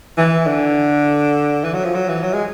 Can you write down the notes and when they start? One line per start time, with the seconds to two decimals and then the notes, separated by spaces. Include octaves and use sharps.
0.18 E3
0.47 D3
1.64 E3
1.74 F#3
1.84 F3
1.94 F#3
2.09 E3
2.23 F#3
2.33 G#3